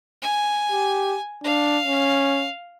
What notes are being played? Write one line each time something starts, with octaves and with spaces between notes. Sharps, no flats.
G#5
G4
D4 F5
C#4